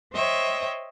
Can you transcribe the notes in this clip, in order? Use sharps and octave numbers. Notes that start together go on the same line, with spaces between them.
C5 C#5 D#5 E5 G5